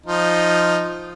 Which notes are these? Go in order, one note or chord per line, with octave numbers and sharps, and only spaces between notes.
F3 D#4